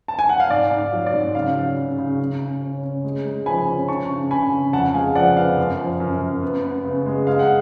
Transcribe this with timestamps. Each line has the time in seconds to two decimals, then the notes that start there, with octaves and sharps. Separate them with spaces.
0.08 A5
0.19 G#5
0.29 F#5
0.40 F5
0.50 G#2 D5
0.71 G#2
0.78 F5
0.93 F#3
1.06 D5
1.13 G#2
1.35 C#3 F5
1.56 F#3
1.77 C#3
1.98 C#3
2.19 C#3
2.40 C#3
2.62 C#4
2.83 C#4
3.04 G#3
3.25 G#3
3.46 F3 G#5 B5
3.67 C#4
3.88 D4 A5 C#6
4.10 C#3
4.31 C#3 G#5 B5
4.52 C#3
4.73 F2 F#5 A5
4.94 G#3 F5 G#5
5.15 F3 D5 F#5
5.36 B3 F5
5.58 F#2
5.79 F3
6.00 F#2
6.21 F#2
6.43 B3
6.64 B3
6.84 C#3
7.06 G#3
7.27 G#3 F5
7.39 F#5